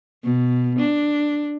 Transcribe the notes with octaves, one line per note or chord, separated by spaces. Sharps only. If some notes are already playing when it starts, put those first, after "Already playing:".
B2
D4